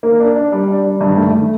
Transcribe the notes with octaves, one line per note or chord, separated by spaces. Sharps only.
A#3
D4
D4
G3
D4
G3
G2
A3
A3